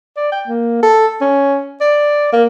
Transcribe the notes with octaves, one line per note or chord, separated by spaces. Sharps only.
D5
G5
A#3
A4
C#4
D5
A#3